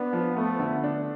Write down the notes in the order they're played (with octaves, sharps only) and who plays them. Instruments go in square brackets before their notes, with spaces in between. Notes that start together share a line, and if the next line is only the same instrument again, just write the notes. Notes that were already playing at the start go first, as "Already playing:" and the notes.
Already playing: [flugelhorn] B3 [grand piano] D4
[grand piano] F3
[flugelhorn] A3 [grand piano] B3
[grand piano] D3
D4